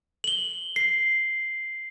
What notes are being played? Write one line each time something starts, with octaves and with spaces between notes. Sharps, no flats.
F#7 G7
C7